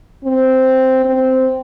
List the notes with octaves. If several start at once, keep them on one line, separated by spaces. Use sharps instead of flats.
C4
C4